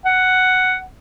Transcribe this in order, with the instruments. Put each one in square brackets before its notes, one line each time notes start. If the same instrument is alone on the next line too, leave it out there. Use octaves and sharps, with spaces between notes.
[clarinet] F#5